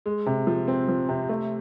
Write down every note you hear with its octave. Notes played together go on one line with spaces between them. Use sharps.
G#3
C3
F3
C4
F3
C3
A3